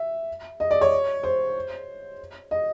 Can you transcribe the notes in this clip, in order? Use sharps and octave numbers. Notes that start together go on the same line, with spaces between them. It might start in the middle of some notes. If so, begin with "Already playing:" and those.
Already playing: E5
D#5
D5
C#5
C5
D#5